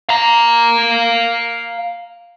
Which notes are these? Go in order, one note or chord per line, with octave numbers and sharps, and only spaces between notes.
F5 A#5